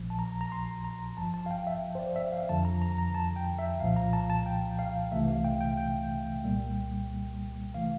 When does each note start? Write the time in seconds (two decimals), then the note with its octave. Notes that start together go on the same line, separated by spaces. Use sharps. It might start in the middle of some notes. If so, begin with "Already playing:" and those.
Already playing: A#1 A#2 F3
0.10 A5
0.19 A#5
0.41 A#5
0.52 C6
0.84 A#5
1.17 G1 G2 F3 A5
1.34 A5
1.46 F5
1.51 G5
1.67 E5
1.95 C5
1.99 D5
2.16 E5
2.32 F5
2.49 F2 D3 F3 A5
2.65 A#5
2.82 A#5
2.98 A#5
3.14 A5
3.36 G5
3.59 E5
3.80 C2 A#2 F3 F5
3.96 A#5
4.13 A5
4.30 A5
4.46 G5
4.79 F5
5.12 C2 C3 E3 A3 E5
5.28 F5
5.45 G5
5.61 G5
5.77 G5
6.43 C2 A#2 G3 A#3
7.74 C3 E3 A3 F5